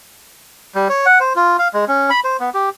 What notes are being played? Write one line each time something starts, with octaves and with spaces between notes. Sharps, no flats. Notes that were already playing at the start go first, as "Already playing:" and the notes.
G3
C#5
F#5
C5
F4
F5
G#3
C#4
B5
C5
B3
G4